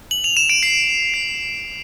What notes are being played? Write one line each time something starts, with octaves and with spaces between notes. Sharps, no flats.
F#7
F7
E7
D7
C7
C7